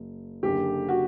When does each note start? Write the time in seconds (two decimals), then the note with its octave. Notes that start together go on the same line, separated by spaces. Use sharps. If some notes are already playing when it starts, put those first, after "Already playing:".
Already playing: F#1
0.43 F#1 F#2 D3 G4
0.89 F#4